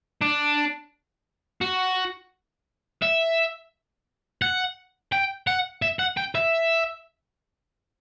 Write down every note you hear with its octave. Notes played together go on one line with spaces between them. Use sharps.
D4
F#4
E5
F#5
G5
F#5
E5
F#5
G5
E5